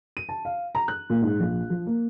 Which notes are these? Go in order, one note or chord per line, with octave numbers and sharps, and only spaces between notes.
D#7
A5
F5
A#5
F#6
A#2
G#2
A#1
F3
A#3